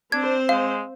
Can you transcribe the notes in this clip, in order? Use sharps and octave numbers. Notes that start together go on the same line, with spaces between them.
C4 D4 C5 G#6
G#3 F5